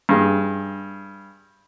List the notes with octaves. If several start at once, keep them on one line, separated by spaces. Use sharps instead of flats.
G2 G#4